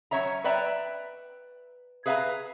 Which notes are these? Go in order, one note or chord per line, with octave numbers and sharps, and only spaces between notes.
F#3 C#4 C#5 E5 A#5
B4 D5 E5 G5 A#5
G#4 B4 E5 F5 G#5 A#5